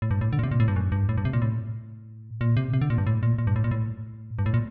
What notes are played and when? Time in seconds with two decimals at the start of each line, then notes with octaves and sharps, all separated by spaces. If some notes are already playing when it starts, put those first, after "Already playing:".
0.02 A2
0.11 G2
0.21 A2
0.33 D3
0.39 A#2
0.43 C3
0.51 A#2
0.60 A2
0.68 G2
0.76 F#2
0.92 G2
1.09 A2
1.18 G2
1.25 C3
1.33 A#2
1.42 A2
2.41 A#2
2.57 C3
2.73 C3
2.81 D3
2.90 A#2
2.98 G2
3.07 A2
3.23 A#2
3.38 A#2
3.47 G2
3.56 A2
3.64 A#2
3.71 A2
4.39 G2
4.46 A2
4.54 A#2